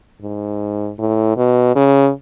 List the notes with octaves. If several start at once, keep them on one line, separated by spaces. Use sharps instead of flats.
G#2
A2
B2
C#3